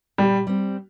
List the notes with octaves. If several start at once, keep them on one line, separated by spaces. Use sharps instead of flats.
A#2 G3
G3 C4